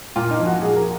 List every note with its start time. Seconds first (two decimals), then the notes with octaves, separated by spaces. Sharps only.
0.16 A#2 F4
0.31 D#4
0.40 F3
0.46 F#4
0.62 A#2 G#4
0.76 A#4